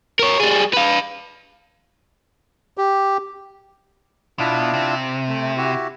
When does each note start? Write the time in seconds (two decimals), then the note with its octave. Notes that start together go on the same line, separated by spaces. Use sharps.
0.19 A#4 C#5
0.40 G3 G#4
0.73 B4 F5
2.78 G4
4.39 B2 D4 E4 F4
4.74 C3
5.28 A3
5.57 E4 F#4 G4